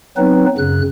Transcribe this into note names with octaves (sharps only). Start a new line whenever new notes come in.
F#3 B3 C4 D#4 B4
F#2 C#3 F#6